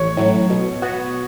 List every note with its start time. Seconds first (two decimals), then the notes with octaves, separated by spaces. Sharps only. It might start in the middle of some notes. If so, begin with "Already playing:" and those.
Already playing: A1 C#5
0.17 A2 F#3
0.50 B2
0.82 B3 F#4